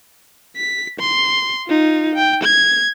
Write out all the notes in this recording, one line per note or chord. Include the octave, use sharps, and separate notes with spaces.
B6
C6
D#4 F4
G5
G#6